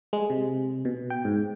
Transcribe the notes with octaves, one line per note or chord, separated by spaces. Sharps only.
G#3
C3
B2
G5
G#2